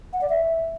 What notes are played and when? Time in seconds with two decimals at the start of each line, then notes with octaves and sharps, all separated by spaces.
0.13 F#5
0.21 D5
0.30 E5